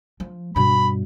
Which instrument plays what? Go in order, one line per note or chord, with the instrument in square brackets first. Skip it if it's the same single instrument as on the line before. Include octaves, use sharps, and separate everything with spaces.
[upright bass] F3
[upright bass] G2 B2 [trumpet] B5